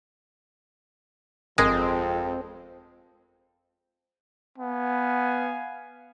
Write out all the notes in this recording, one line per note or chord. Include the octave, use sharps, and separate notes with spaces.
G1 F2 G#3 C4 A#4 D#6
B3 F5 G#5